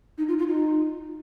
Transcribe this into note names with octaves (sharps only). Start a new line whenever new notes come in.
D#4
F4
F4
D#4